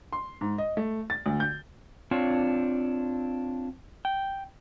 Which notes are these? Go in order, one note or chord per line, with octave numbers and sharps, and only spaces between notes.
C6
G#2
D#5
A3
A6
D2
G6
C4 D4 F4 C#5
G5